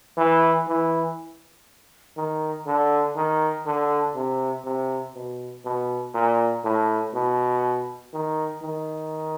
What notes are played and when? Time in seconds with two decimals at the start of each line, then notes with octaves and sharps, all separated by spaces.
0.17 E3
0.68 E3
2.17 D#3
2.66 D3
3.16 D#3
3.66 D3
4.15 C3
4.65 C3
5.15 B2
5.65 B2
6.14 A#2
6.64 A2
7.14 B2
8.13 D#3
8.62 D#3